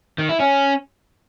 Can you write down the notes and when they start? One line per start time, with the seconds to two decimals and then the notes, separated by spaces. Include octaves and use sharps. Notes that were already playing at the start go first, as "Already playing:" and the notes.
0.18 D#3
0.29 E4
0.40 C#4